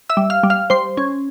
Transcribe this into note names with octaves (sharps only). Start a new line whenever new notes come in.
E5 E6
G3
F5 F6
G3
F5 F6
G3 C5 C6
C#4